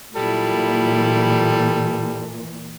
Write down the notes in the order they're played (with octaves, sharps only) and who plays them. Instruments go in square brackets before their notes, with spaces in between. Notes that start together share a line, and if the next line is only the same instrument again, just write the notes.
[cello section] A#2 E3 [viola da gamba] F#3 E4 F4 [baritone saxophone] G3 [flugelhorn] A4